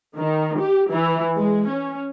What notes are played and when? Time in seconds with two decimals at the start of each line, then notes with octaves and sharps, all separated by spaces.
0.17 D#3
0.59 G4
0.91 E3
1.36 G#3
1.68 C#4